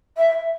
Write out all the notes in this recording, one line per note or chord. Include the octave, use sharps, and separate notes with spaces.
E5